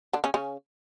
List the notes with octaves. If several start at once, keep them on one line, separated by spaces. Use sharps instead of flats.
D3 D4
C#3 C#4
C#3 C#4